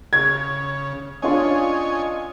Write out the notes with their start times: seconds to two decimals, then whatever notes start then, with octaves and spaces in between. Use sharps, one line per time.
0.13 C#3 G#6
1.22 C#4 D4 F4 C#5 D#5 G#5